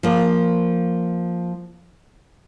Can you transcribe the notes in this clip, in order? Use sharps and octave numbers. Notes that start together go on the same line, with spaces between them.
F3 A#3